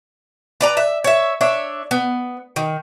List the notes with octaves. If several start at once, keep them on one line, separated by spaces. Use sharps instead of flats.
B4 D5 A#5
E5
C#5 E5
D4 C#5 E5
B3
D#3